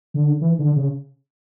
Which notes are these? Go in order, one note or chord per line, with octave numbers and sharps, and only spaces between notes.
D3
E3
D3
C#3